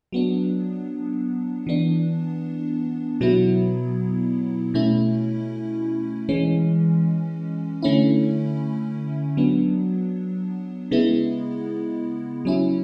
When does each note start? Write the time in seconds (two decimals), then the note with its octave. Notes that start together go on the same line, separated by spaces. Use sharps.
0.12 F#3 B3 D4
1.67 E3 B3 D4
3.21 B2 F#3 B3 E4
4.74 B2 A3 C#4 E4
6.29 E3 G#3 C#4
7.82 D3 A3 C#4 E4
9.37 F#3 B3 D4
10.91 C#3 G#3 B3 E4
12.45 F#3 C#4 E4